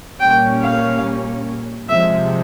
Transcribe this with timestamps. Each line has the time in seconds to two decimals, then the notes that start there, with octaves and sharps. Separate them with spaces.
0.20 A#2 G3 A#3 C#4 G5
0.62 F5
1.89 C3 F3 G#3 E5